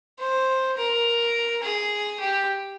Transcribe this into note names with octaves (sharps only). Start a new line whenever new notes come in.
C5
A#4
G#4
G4